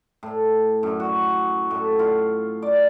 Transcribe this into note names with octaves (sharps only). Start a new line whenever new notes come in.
A2
F#2
F#4
A2
F4
D5